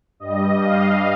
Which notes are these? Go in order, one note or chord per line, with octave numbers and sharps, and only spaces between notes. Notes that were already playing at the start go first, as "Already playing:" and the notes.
G2 G3 D#5
F5